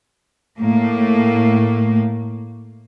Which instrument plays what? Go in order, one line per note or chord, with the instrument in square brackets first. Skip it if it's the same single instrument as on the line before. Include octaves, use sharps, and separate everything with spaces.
[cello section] A2 A3 A#3